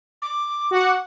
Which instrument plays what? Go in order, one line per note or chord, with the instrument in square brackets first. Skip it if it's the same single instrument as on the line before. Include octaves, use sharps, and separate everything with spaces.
[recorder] D6
[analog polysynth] F#4 F#5